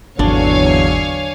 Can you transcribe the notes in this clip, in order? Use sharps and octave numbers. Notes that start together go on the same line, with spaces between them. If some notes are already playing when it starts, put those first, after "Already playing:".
G#1 E2 D3 F#3 D4 C#5 F5 G#5